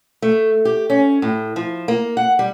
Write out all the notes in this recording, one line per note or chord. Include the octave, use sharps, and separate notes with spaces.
A3
G4
C#4
A2
F3
A#3
F#5
G3